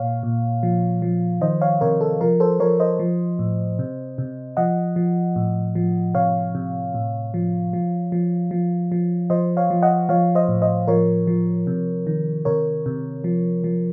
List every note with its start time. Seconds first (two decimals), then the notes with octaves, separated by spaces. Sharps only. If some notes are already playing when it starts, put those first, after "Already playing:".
Already playing: A#2 C#5 F5
0.23 A#2
0.63 F3
1.02 F3
1.41 D#3 C5 D#5
1.61 C#5 F5
1.81 C3 A#4 C#5
2.01 A4
2.21 F3 A#4
2.40 A4 C5
2.60 F3 A#4 C#5
2.80 C5 D#5
2.99 F3
3.39 A2
3.79 C3
4.18 C3
4.57 F3 D#5 F#5
4.96 F3
5.36 A2
5.75 F3
6.14 C3 C#5 F5
6.55 C3
6.94 A2
7.34 F3
7.73 F3
8.12 F3
8.51 F3
8.92 F3
9.30 F3 C5 D#5
9.57 C#5 F5
9.70 F3
9.83 D#5 F#5
10.09 F3 C#5 F5
10.35 C5 D#5
10.48 A2
10.62 C5 D#5
10.88 F3 A#4 C#5
11.27 F3
11.67 C3
12.07 D#3
12.45 C3 A#4 C#5
12.86 C3
13.24 F3
13.64 F3